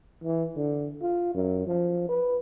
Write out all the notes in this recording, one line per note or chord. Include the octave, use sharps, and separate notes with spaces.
E3
D3
F4
F#2
F3
B4